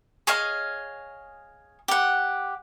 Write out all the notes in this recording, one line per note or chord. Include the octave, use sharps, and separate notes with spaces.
G#4 C#5 D#5 F5
G4 F#5